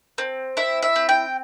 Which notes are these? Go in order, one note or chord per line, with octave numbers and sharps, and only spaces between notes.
C4
E4 E5
E5
C4
G5